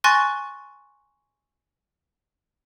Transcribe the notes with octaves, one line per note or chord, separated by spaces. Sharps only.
G#5 C6 C#6 F#6 A6 A#6